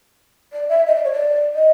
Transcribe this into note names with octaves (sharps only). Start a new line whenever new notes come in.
D5
E5
D#5
D5
C#5
D5
D#5